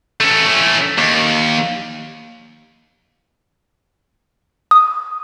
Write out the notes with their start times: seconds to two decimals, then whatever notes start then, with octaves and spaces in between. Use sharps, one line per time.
0.21 A3 C#4
0.98 D#2
4.71 D#6